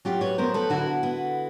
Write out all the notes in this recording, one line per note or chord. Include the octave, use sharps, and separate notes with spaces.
F#3 F4 G4
B4 C#5
B3 A#4 C5
A4 B4
D3 E4 F#4
B3